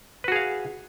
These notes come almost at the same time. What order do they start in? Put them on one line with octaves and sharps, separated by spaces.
B4 F#4 G#4 F5